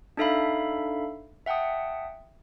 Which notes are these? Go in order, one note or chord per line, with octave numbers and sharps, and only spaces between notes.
D4 D#4 A4 E5 F5 B5
E5 F#5 G5 A5 D#6